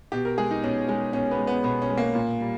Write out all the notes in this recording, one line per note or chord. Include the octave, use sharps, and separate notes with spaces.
B2 G4
A#4
G#3 G#4
D#4
B2 C#4
G#3 C#4
B2 C#4
B3
G#3
B3
B2 B3
C#4
G#3
A#3
A#2
G3